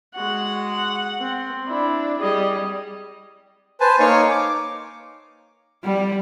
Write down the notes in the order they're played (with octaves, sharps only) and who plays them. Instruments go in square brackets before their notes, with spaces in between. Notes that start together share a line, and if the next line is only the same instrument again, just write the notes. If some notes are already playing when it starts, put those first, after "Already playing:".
[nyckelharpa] G#3 F#4 [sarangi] F#5
[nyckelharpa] C4
[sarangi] D4 [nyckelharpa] E4
[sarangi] G3 [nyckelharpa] G#4 D#5
[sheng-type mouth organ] B4 C5 G#5 A5
A#3 D#4 C#5 F5 G#5 C#6
D6
[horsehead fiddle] G3